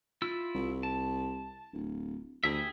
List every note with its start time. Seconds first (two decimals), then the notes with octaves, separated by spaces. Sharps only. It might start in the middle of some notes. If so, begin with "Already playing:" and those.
0.22 E4 F4 E6
0.55 C2
0.83 A5
1.73 D1
2.44 D2 G4 G#4 E5